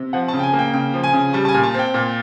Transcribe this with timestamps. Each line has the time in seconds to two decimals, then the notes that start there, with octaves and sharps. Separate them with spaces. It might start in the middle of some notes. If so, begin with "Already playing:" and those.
Already playing: C3
0.13 F3 F#5
0.28 A5
0.34 C#3
0.39 G5
0.43 G#5
0.53 A#3
0.59 G5
0.74 C#3 G5
0.94 F3
1.04 G#5
1.14 C#3
1.33 G3 A5
1.45 A5
1.49 G#5
1.54 A#2
1.63 A5
1.74 C4 G5
1.94 A#2